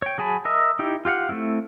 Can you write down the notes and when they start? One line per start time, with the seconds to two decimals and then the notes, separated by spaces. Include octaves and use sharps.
0.02 C#5 G5
0.18 F#3 G#4 G#5 A5 B5
0.45 A#4 D#5 E5
0.79 D#4 E4 G4
1.05 F4 G4 F5 F#5
1.29 A3 A#3 C4 E4